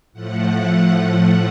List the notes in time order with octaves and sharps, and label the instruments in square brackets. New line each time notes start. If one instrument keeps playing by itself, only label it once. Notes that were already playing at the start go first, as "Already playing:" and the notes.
[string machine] A2 F3 A3 F#5